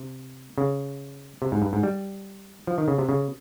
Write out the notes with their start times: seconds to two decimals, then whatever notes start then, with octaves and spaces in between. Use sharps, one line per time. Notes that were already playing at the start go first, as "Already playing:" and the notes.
Already playing: C3
0.58 C#3
1.42 C3
1.52 G#2
1.62 G2
1.73 G#2
1.83 G3
2.67 F3
2.78 D#3
2.88 C#3
2.98 C3
3.09 C#3